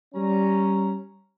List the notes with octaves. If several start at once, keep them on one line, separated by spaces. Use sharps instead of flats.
G3 C#4 A#5